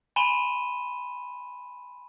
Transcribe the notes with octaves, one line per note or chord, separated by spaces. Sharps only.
G#5 B5 C6 D#7 E7 G7